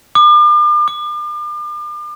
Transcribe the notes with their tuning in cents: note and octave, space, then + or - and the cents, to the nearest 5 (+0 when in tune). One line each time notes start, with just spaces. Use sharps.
D6 +40
D6 +40